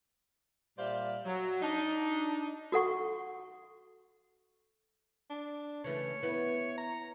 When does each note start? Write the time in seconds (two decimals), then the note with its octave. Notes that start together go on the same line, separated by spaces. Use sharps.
0.77 A#2 G3 C5 D5 E5 F5
1.25 F#3
1.62 D4 D#4
2.72 F#4 A4 F#5 C#6
5.30 D4
5.84 C#3 E3 A3 C#5
6.23 B3 E4
6.78 A#5